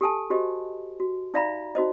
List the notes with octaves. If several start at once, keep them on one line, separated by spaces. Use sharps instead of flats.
G4 A4 G#5 A5
F#4 G4 C5 D#5
F#4
D#4 D5 E5 F5 A#5 B5
D#4 F#4 C5 D#5